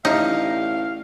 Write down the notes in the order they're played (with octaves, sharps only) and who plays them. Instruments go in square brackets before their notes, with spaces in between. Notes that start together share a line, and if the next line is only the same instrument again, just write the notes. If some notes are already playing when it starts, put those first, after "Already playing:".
[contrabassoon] A1 [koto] D#4 [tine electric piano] G4 D5 E5 [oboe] F5